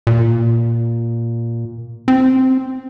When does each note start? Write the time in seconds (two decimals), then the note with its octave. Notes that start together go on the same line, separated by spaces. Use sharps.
0.07 A#2
2.08 C4